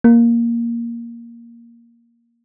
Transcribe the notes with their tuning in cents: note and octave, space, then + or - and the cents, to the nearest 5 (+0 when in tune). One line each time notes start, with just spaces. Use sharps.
A#3 +5